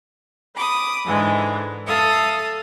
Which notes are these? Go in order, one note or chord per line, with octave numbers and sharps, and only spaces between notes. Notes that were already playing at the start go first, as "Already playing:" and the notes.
B5 D6 D#6
G#2 D3 E3 G#3
A4 E5 F5 D#6